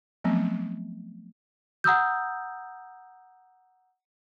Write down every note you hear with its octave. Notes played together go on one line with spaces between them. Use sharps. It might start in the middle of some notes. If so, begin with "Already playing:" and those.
F3 F#3 A3 B3 C4
F#5 A#5 D#6 E6 G6